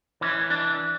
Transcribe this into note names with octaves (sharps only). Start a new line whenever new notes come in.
E3 C#4
D4